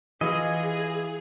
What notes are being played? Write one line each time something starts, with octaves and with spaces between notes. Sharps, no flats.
E3 F4 G#4 D#5